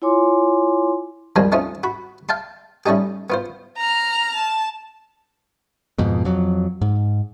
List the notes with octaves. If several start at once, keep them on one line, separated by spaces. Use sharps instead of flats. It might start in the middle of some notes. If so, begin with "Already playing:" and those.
E4 F4 C#5 G#5 C6 D6
D#2 F3 G3 G#3 C4 G#5
A3 C4 C#4 D#4 F4
F#4 B5
F5 G5 A5 C6
G3 A3 C#4 D#4 G4
B3 F4 C5
A#5 F6
A5
F2 G#2 B2
F2 F#3
G#2